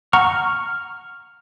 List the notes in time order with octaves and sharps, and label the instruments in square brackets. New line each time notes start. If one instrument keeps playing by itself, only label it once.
[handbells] F#5 A#5 C#6 [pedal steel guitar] F6